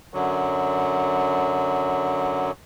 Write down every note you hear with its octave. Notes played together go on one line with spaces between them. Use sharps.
F#2 D3 F#3